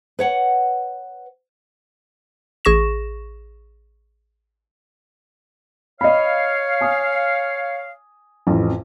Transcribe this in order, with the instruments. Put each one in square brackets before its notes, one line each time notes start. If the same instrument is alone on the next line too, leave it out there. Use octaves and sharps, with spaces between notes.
[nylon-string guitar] B4 C#5 F#5
[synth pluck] A1 G#4 C#6 A#6 E7
[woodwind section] C#5 F5 [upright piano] D#5 B5
[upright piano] G#5 D#6
[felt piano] A1 F2